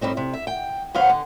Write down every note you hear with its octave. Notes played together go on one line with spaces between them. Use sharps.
A2 G3 C4 D#4
C3
E5
G5
D#2 F#3 B3 C5 F5 F#5
D3